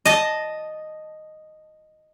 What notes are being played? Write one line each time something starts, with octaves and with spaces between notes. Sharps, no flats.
D#5 A5